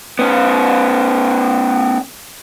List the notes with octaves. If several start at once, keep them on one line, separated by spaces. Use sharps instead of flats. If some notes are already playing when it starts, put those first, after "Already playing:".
B3 C#4